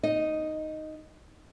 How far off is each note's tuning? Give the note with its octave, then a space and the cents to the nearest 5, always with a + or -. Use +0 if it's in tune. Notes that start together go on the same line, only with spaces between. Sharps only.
D#4 +0 D#5 +0